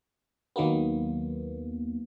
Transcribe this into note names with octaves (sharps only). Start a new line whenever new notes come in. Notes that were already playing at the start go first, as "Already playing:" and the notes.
D#2 D#3 F#3 A#3 B3